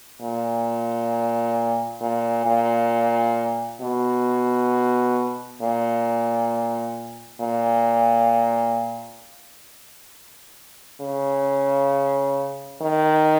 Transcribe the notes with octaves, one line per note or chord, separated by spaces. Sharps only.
A#2
A#2
A#2
B2
A#2
A#2
C#3
D#3